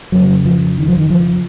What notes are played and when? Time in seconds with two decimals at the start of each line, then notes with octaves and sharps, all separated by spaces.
0.12 F2 C#3 F#3
0.45 F3
0.78 D#3
0.88 F3
0.97 D#3
1.10 F3